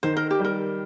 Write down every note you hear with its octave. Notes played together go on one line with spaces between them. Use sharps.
D#3 C5
A#4
G4
G3 A#4